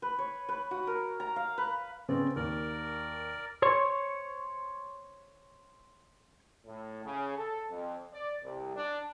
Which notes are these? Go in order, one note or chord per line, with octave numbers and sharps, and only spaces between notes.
B4
C#5
B4
F#4
A#4
A#5
F5
B4
C#3 B3 C4 D5
D#2 A#4 D5
C5 C#5 C#6
A2
C#3
A4
F2
D5
C2
D4